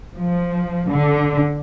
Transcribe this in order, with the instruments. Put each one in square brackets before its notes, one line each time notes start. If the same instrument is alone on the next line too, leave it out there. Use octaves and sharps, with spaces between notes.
[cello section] F3
D3